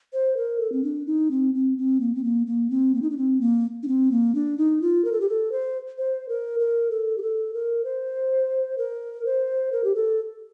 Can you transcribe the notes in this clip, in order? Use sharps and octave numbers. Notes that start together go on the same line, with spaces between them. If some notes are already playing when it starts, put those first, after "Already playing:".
C5
A#4
A4
C4
D4
D#4
C4
C4
C4
A#3
C4
A#3
A#3
C4
A#3
D#4
D4
C4
A#3
D4
C4
A#3
D4
D#4
F4
A#4
A4
G4
A4
C5
C5
A#4
A#4
A4
G4
A4
A#4
C5
A#4
C5
A#4
G4
A4